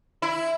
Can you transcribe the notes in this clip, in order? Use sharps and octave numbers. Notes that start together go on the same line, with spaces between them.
E4